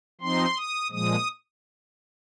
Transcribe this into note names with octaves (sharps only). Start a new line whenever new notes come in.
F3 C4 D#4 C6
D#6
A#2 F3 G#3 D#6